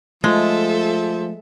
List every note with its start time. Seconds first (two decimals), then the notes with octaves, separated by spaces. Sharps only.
0.24 F3 G#3 A3 A4 E5